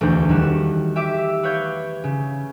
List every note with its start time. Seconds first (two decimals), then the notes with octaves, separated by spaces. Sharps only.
0.01 E1 D2 A3 D#4 G6
0.29 D#3 G3 F#4 E7
0.96 G4 E5 D6 E6
1.43 B4 C#5 F5 G6 G#6
2.04 C#3